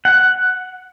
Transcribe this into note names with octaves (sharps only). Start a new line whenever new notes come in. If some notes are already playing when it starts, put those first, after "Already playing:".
F#5